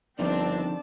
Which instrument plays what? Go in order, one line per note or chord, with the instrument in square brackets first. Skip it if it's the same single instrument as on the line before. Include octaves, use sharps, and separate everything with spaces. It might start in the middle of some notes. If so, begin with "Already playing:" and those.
[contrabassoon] G1 [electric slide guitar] D3 D#3 F3 [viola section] C4 D4 [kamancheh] D5 A5